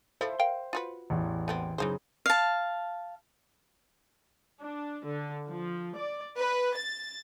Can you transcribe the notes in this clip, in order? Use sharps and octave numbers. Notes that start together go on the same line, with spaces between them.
F3 E4 A4 C5 E5
A#4 F5 G5
F4 F#4 B4
A1 E2
A3 B3 C4
F#2 C#3 E3 D#4 C5
F5 A5
D4
D3
F3
D5
B4
A6